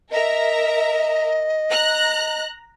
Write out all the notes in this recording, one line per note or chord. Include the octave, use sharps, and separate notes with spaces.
A#4 D#5 E5 A#5
A#5 F#6